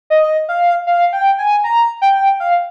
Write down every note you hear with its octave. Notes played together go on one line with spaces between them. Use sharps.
D#5
F5
F5
G5
G#5
A#5
G5
F5